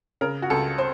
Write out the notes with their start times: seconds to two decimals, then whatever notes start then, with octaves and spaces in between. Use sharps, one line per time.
0.21 C#3 A#4
0.42 F#4
0.50 C#2 A4
0.78 C5